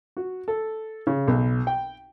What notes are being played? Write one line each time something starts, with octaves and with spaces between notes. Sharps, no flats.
F#4
A4
C#3
B1
G5